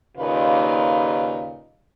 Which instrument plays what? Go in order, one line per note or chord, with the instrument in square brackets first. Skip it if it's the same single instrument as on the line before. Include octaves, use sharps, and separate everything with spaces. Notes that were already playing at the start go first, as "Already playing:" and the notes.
[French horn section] D#2 A#2 C#3 D#4 F4 B4